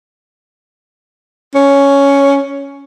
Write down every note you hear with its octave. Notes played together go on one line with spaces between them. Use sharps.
C#4